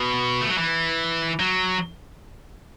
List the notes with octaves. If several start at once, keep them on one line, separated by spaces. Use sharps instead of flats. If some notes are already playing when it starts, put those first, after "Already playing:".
Already playing: B2
A3
F#3
E3
F#3